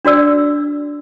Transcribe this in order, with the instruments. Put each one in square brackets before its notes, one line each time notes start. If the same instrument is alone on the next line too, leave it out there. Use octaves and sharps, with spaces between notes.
[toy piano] D4 F#4 D5 E6